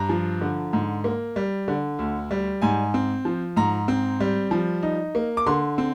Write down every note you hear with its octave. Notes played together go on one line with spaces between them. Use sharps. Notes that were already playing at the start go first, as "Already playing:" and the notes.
Already playing: G2 A#5
F3
D3
G#2
A#3
G3
D3
D2
G3
G#2 G#5
C4
F3
G#2 A#5
C4
G3
F3
D#4
A#3
D6
D3 C6
C4